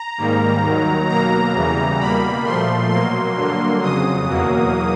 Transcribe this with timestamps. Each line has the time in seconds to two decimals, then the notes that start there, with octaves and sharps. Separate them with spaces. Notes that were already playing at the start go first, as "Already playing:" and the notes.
Already playing: A#5
0.18 G#2 D#3 G3 A#3
0.63 D#2 D#3 F#3
1.09 B2 F#3 A#3 A#5
1.54 E2 C#3 E3 G3
2.00 B2 G3 A#3 B5
2.45 A#2 F3 A3 C6
2.90 B2 F#3 A#3 C6
3.36 G2 D3 F#3 A#3
3.82 F2 C#3 F#3 D#6
4.27 E2 B2 F#3 A#3